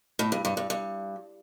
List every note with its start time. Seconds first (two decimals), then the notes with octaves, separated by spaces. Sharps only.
0.19 A2
0.32 G2
0.45 G2
0.57 G2
0.70 G2